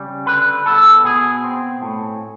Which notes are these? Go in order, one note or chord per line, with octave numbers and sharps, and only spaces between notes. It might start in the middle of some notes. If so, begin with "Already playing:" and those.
Already playing: C#3 G3
D3 B4
B3 A4
B2 G#4
C4
A2